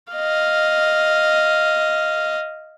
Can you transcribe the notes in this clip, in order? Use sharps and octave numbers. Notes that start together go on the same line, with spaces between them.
D#5 F5